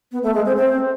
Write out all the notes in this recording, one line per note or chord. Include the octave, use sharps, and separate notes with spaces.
B3
A3
G#3
C4
C4